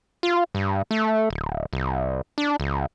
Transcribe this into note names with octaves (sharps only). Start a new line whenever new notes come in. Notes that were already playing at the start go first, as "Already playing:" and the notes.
F4
G2
A3
D1
C2
D4
C#2